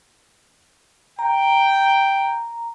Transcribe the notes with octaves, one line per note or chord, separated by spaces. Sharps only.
G5 A#5